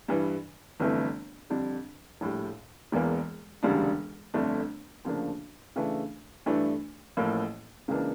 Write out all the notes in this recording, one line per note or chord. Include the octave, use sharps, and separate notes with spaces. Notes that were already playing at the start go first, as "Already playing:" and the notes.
G2 E3 G3
G1 F2 E3 A3
F2 D3 G3 D4
A#1 A2 G3
E1 E2 E3 A#3
E1 D2 C#3 G3 D4
G1 F2 D3 A3 D4
D2 C#3 F3 A#3 D4
C#3 E3 A3 D4
G2 E3 A3 D4
A1 A2 F3 A#3
C#2 C#3 E3 A#3 D4